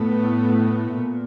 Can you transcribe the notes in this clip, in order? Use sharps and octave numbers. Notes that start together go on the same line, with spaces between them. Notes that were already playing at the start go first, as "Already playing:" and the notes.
Already playing: A2 A3 B3
A#2